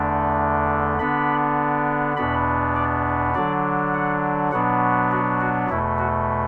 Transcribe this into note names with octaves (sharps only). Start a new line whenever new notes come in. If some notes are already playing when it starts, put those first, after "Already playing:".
Already playing: E2 D3 A3 D4
D3 B3 D4 B5
E2 B2 B3 D4 B5
D5
D3 F#3 D4 D5
F#5
B2 F#3 B3 D4 F#5
F#4
F#4
E2 B2 A3 E4
F#4